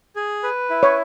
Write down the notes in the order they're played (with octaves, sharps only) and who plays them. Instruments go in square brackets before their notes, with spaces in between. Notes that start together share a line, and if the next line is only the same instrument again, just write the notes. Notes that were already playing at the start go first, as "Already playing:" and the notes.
[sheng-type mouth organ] G#4
B4
E4
[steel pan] C#5